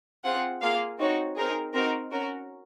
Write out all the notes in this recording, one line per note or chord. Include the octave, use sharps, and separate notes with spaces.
C4 F4 G#4 F#5
A#3 F4 G#4 F5
C4 D#4 F#4 C#5
C4 D#4 G#4 A#4
C4 D#4 F#4 A#4
C#4 F#4 A#4